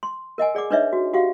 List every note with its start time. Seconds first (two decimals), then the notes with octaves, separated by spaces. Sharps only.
0.03 C6
0.38 A#4 D#5 F#5 G#5
0.55 G#4 D5 F#5 D6
0.71 D4 D#4 B4 C#5 D#5 E5
0.93 F#4
1.14 F#4 G4 F5 F#5